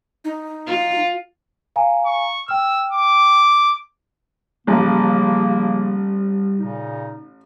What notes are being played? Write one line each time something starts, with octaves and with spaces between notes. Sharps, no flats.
D#4
F4
F5 G#5 A#5
C#6
G5 E6 F6
D6
A1 C#3 F3 G3 A#3
A#2 C#3 D#4